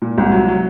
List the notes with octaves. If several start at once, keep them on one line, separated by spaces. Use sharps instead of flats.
A#2
C2
F#3
F#3